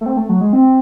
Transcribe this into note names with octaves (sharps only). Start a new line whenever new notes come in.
A3
C4
A3
F#3
G#3
C4